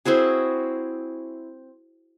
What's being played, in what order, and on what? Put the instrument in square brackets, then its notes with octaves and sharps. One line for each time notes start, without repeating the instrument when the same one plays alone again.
[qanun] C4 E4 F#4 G#4